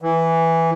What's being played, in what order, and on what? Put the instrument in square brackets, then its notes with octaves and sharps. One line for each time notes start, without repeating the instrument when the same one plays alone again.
[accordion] E3